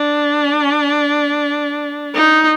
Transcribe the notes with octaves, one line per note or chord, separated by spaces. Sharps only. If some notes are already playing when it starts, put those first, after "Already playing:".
Already playing: D4
D#4